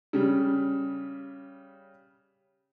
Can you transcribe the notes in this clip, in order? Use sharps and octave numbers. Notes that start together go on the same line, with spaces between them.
C#3 G3